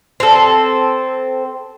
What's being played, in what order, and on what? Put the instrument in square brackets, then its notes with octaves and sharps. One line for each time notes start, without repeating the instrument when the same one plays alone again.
[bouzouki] C4 A4